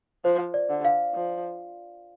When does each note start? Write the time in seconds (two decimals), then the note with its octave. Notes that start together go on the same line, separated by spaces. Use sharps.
0.25 F3 C5
0.54 D5
0.69 D3
0.85 F5
1.14 F3